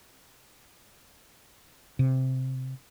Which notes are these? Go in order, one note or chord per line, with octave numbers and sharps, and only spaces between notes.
C3